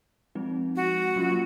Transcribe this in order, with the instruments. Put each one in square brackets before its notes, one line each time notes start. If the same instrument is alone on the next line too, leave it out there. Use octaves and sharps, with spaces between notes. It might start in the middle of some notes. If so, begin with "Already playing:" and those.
[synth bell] F3 G#3 C4 D#4
[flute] F#4
[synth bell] F#3 A#3 C#4 F4